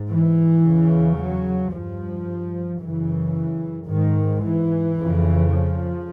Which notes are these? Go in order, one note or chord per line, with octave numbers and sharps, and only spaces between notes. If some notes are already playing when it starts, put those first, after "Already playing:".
Already playing: G#2
E3
E2 C#3
F#3
G2 F3
F#2 C#3 E3
G#2 D#3
E3
F2 C#3
F3